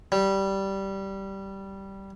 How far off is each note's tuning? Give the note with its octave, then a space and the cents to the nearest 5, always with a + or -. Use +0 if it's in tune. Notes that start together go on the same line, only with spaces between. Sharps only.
G3 -10